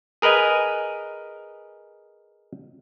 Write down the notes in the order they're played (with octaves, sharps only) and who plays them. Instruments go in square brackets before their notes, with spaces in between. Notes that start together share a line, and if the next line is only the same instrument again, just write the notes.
[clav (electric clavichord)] G#4 A#4 B4 D#5 G#5